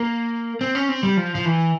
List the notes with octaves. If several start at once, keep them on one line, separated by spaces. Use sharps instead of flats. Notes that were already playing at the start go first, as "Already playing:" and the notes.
Already playing: A#3
C4
C#4
C4
G3
F3
F3
E3